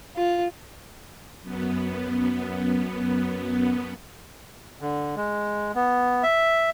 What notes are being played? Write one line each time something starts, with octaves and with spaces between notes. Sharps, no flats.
F4
F#2 B3
D3
G#3
B3
E5